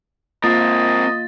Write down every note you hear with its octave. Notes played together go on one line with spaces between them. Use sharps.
A#3 C4 F4 A#4 D#5 A6